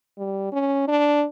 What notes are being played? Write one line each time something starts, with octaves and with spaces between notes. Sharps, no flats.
G3
C#4
D4